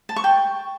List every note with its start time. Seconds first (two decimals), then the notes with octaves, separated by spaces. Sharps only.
0.09 A5
0.16 C#6
0.24 G5